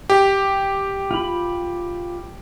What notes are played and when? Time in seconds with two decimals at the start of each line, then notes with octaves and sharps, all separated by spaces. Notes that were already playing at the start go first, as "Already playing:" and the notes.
0.10 G4
1.11 F4 B5